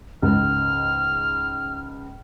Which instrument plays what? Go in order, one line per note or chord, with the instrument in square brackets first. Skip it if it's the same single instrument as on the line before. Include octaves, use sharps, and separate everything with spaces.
[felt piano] C#2 G#2 [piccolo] F6